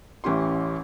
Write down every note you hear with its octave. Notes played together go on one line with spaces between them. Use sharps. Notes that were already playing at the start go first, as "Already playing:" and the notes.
A1 E3 C#4 G4 C6